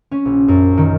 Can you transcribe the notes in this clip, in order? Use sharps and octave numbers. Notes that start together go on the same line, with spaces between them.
C#4
A#1
F#2
D#3